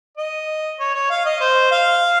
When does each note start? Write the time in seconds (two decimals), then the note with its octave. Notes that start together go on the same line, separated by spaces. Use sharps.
0.18 D#5
0.80 C#5
0.95 C#5
1.10 F5
1.25 D#5
1.41 C5
1.72 F5